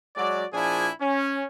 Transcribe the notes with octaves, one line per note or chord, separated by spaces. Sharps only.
F#3 G#3 F#4 D5
A#2 F3 D4 E4 G#4 G#5
C#4